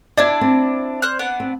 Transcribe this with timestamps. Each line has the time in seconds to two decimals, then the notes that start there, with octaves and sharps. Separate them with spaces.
0.17 D4 E4 D5 G#6
0.41 C4
1.02 C5 F6 F#6
1.19 B3 D4 F#5
1.40 C4